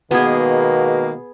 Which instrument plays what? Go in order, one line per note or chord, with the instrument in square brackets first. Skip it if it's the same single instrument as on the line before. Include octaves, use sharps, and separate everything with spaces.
[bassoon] B2 [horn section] D#3 G#3 A#3 [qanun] B3 G#4